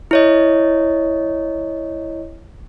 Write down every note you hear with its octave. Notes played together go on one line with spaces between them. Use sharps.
E4 C#5 D#5